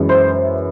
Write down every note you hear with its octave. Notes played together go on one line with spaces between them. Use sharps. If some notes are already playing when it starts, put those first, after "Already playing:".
Already playing: F#2 E3 G#3
C5
C5